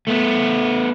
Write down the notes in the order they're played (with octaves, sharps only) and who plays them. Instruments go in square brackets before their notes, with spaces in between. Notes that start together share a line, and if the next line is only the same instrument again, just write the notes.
[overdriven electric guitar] A3 B3